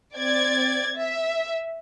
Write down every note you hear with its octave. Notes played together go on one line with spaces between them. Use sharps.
C4 D5 G#6 A6
E5